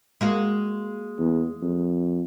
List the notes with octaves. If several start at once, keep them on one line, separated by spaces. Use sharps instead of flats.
G#3 A#3 F#4
E2
F2